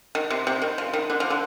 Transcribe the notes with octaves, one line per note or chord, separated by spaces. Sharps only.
D#3
C3
C3
D#3
F3
D#3
D3
F3
D3